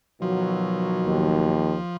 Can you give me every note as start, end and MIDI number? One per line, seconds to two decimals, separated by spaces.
0.22 1.55 47
0.22 1.55 51
0.22 1.97 53
0.22 1.55 54
1.06 1.78 39